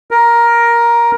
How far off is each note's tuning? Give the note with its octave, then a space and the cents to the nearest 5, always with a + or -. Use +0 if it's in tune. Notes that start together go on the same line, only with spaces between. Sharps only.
A#4 +10